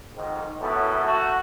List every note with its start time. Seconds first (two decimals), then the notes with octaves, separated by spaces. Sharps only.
0.15 F2 G#2 D#3
0.61 F#2 A2 B3 E4 A4
1.03 A3 F#4